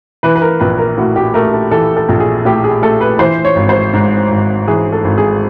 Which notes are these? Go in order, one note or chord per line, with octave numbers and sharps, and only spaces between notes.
E3 B4
B4
A#4
A#1 B4
A#4
A2 F#4
G4
A3 A#4
A4
E3 A4
A4
A#1
G#4
A2 G4
G#4
A3 A4
B4
E3 C5
C#5
G#1
C5
G#2
G#1
E3 G#4
A4
G#1
G#4